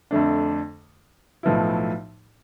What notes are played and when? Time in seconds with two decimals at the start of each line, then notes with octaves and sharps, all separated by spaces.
0.11 F2 D3 A3 D4
1.43 B1 A2 F3 B3 E4